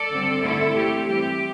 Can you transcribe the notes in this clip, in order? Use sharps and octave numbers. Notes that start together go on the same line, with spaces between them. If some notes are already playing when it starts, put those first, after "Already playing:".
Already playing: A4 D5
D3 G3 C4
D3 A3 C4 E4 A4
E3 A3 C4 G4
E3 G3 C4 G4